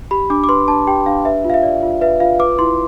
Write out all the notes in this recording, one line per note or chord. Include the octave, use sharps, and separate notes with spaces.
G4 B5
D4 D6
D6
B4 C6
D4 A5
G4 G5
D4 F5
B4 E5
F4
F5
E5
D5
F4
B4 E5
F4 F5
B4 D6
E4 C6